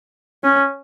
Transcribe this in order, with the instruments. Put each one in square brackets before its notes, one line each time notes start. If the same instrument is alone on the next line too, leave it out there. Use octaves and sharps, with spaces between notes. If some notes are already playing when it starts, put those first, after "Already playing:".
[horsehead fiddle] C#4